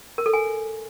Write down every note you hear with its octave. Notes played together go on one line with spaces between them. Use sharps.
A#4
A4
G#5